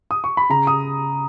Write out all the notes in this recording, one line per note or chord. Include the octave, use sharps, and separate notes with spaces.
D#6
C#6
B5
C#3 A#5
D#6